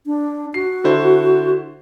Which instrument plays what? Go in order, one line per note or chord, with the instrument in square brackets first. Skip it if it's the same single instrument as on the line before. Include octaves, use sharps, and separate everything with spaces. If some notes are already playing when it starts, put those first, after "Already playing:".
[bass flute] D4
[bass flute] F#4 [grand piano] C7
[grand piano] D3 E4 C5